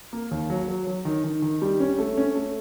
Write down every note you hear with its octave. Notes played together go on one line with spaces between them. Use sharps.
A#3
D#2
F#3
F#3
F#3
D#3
D#3
D#3
G3
C#4
A3
C#4
A3